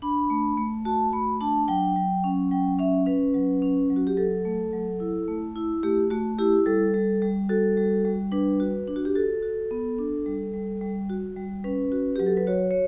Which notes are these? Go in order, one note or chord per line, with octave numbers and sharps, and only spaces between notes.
D4 B5
A3
A3
F#4 A5
A3 B5
D4 A5
F#3 G5
F#3
C#4
F#3 G5
C#4 E5
C#4 B4
F#3
C#4
F#3
F#4
G4
F#3 A4
A3
F#3
E4
A3
E4
A3 G4
A3 F#4
E4 G4
G3 A4
G3
G3
F#4 A4
G3
G3
D4 B4
F#4
D4
F#4
G4
F#4 A4
F#4
B3
D4
G3
G3
G3
F#4
G3
C#4 B4
F#4
F#3 G4
A4
B4
F#4 C#5
C#5